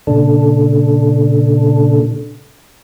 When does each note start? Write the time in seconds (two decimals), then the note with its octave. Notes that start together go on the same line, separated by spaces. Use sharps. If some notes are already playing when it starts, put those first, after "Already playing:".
0.07 A#2 C#3 D4 A4